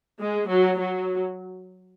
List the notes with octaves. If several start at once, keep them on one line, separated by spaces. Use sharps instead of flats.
G#3
F#3
F#3